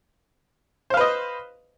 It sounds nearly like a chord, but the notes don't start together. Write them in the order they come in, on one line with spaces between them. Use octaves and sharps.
C5 F5 B4 D#5